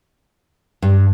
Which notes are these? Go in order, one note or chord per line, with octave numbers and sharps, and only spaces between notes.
G2